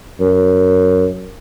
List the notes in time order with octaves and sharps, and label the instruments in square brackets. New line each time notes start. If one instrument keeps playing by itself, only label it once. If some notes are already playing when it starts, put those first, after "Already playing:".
[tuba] F#2